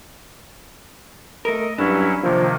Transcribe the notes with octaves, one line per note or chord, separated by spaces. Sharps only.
A3 A#4 D#5
G2 F#3 C#4 D4 E4
C3 D#3 F3 A#3